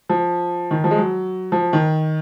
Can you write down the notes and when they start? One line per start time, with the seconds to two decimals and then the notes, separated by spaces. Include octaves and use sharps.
0.09 F3
0.71 D#3
0.84 F3
0.91 G#3
0.98 F#3
1.52 F3
1.73 D#3